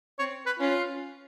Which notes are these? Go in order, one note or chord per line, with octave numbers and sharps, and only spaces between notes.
C4 C#5
B4
C#4 F4